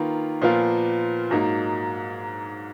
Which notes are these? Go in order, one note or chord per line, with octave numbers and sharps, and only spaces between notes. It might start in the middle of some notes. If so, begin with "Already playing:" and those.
Already playing: D#3 A#3 F4 B4
A#2 F3 B3 F4 A#4
G#2 F#3 A#3 D#4